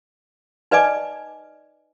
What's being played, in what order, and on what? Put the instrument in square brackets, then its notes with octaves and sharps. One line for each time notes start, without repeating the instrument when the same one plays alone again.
[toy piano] D#4 B4 D5 D#5 G#5 D6